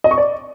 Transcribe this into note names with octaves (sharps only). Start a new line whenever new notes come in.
D#5
C#6
D5